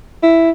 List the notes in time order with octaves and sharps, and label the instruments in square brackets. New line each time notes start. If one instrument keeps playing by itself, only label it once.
[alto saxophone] E4